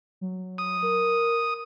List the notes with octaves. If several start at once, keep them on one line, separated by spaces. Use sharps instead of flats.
F#3
D#6
A#4